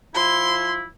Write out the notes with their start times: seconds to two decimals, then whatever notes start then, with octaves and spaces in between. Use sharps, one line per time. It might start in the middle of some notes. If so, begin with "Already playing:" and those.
0.15 F3 E4 C6